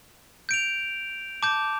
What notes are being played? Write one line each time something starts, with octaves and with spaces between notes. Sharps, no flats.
G6 D7 F7
A5 D6 G6